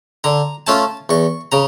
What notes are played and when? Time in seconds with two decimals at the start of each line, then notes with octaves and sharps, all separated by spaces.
0.24 D3 A#5
0.67 A3 C#4 F4 A5
1.09 E2 C#6
1.52 C#3 A#5